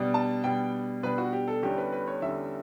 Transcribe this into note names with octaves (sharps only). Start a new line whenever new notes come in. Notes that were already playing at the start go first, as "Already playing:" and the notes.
Already playing: B2 G3 D4
A5
B2 G3 D4 G5
B2 G3 D4 B4
F#4
G4
A4
E2 D3 G3 C#4 G4
B4
B4
C#5
E2 D3 G3 C#4 E5